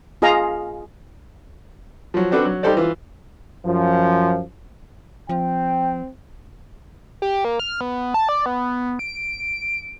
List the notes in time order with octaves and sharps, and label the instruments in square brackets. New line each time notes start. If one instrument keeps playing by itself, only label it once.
[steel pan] F4 G#4 D#5 F5 A#5
[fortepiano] F3 F#3
C4 D4 F#4 A4 B4
F#3
G3 D#4 G4 A4 C5 D5
E3 F4
[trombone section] F#2 F3
[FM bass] F3 [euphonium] C4 [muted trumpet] G5
[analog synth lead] G4
A#3
F6
B3
A5
D5
B3
D7